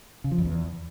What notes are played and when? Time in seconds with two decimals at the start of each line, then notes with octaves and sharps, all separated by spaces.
0.24 C#3
0.31 F3
0.38 F2
0.45 E2